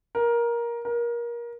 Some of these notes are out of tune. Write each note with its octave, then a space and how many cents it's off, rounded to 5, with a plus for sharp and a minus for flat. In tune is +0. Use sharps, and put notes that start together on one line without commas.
A#4 +15
A#4 +25